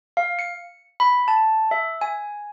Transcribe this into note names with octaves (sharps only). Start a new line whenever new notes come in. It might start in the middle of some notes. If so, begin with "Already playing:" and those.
F5
C#7
B5
A5
E5
G#5